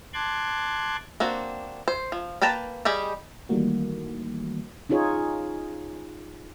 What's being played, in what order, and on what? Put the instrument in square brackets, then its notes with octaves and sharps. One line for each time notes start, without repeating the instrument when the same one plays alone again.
[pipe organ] A5 C6 D6 F#6 G#6
[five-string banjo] A#3 C4 D4 F#4
C5
F3
A#3 B4 G5 A5 A#5
G3 G4 G#4 D#5
[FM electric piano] D#3 E3 G3 A3 A#3 F#4
[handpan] C#4 D#4 F4 G#4 C#5